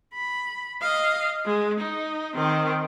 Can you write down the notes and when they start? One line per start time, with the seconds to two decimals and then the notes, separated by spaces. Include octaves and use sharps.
0.14 B5
0.82 D#5 F5
1.45 G#3
1.80 D#4
2.36 D#3 C4